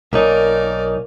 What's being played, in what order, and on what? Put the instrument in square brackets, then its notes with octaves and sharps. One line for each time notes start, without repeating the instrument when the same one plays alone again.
[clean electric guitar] B1 D#4 [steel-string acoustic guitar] A#3 C#4 [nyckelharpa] A#4 D5